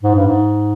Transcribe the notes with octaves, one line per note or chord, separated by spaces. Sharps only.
G#2
G2
G#2